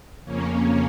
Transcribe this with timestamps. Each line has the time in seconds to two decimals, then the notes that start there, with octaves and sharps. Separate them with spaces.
0.25 F2 C#3 A#3 C#4